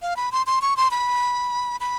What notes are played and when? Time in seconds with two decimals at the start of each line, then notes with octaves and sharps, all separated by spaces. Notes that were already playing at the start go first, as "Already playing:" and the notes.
0.02 F5
0.17 B5
0.32 C6
0.47 C6
0.62 C#6
0.77 C6
0.91 B5
1.80 B5